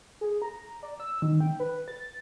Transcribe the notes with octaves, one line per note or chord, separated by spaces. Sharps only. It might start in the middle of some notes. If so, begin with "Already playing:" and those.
G#4
A#5
D5
E6
D#3
G5
B4
A6